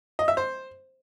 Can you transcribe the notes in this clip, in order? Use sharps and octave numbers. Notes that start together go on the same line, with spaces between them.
D#5
E5
C5